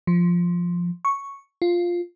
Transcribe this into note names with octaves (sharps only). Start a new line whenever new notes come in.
F3
C#6
F4